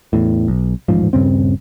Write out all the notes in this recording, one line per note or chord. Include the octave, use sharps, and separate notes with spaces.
E2 A2
B1
D#1 A1 G#2 F3
D#1 G2 C#3 C4